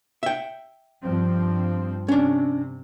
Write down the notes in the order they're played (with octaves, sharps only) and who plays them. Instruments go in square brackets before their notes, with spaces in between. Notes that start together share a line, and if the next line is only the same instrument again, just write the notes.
[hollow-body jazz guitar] E5 G5
[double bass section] G2 F3 C4
[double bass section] C3 [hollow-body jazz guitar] C#4 D4